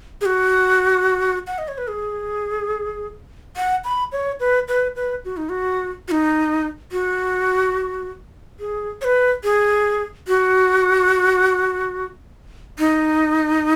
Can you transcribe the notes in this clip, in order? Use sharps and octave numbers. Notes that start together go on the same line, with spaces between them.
G#4
F#4
F#5
D#5
C#5
B4
G#4
F#5
B5
C#5
B4
B4
B4
F#4
D#4
F#4
F#4
D#4
F#4
G#4
C#5
B4
G#4
F#4
D#4